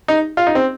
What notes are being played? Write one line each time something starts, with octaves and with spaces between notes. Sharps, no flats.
D#4
F4
D#4
C4